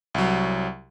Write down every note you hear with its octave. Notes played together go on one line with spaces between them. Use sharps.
C2 F#3